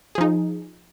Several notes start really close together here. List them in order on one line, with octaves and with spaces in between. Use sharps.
G#4 F3 D#4